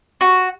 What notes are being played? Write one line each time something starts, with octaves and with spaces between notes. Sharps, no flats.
F#4